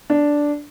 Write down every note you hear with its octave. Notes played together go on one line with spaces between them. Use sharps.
D4